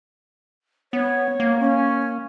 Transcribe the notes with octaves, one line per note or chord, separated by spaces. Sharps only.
B3 C#5
A#3
C#4